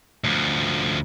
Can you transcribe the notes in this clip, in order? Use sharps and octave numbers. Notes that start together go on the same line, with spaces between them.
D2 F3